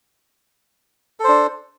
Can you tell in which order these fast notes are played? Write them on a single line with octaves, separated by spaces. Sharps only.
A4 C5 D4